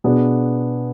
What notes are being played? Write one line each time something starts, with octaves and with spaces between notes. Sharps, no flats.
B2 B3 D4 G#4